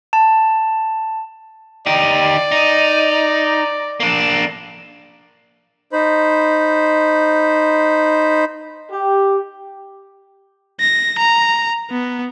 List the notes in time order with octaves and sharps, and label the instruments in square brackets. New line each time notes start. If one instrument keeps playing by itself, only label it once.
[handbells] A5
[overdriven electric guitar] D#4 G4 [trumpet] D5
[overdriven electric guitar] D#4
A#3 D4
[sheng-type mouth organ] D#4 C5 B5
[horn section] G4
[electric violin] A#6
A#5
B3